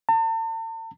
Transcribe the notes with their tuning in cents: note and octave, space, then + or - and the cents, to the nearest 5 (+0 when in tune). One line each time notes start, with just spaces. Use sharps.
A5 +45